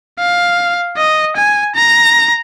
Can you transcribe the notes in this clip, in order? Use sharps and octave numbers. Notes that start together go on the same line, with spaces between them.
F5
D#5
G#5
A#5